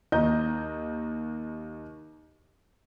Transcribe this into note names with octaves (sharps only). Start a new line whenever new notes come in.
D#2 D#5 A#5 G6